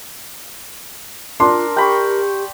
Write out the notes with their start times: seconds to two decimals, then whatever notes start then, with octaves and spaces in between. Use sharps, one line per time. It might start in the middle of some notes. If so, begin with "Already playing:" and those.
1.40 D4 F4 A#4 C6
1.77 G4 G5 B5 C#6